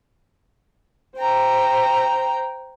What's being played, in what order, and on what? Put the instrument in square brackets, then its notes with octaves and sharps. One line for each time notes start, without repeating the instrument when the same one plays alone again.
[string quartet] C5 G5 A#5